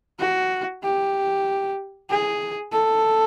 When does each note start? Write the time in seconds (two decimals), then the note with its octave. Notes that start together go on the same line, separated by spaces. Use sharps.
0.19 F#4
0.83 G4
2.10 G#4
2.72 A4